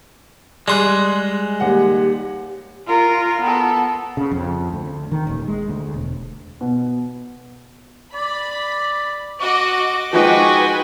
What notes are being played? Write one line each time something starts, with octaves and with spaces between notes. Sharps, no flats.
G3 G#3 G#4 C6 F#6
D#2 G4 F#5
F4 A#4
B3 A4
C#3
F2
D2
D#3
D#1
G#3
D2
E1
B2
D5 B5
F#4 D#5 D6
F3 G#3 D#4 F#4 B4 G5 G#5